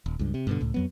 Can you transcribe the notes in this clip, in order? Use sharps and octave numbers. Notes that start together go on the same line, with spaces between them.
D#1
C#2 G2
C3
G2 B2 D3
C#2 A2
F2 F#3 B3